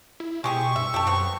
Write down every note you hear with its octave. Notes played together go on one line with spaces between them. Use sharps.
E4
B2 G#3 G4 G#4 C#6
G2 E5
F#2 G4 A4
B3 C4